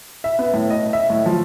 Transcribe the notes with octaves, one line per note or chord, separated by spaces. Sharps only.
E5
B3
A2
D#5
E5
A2
F3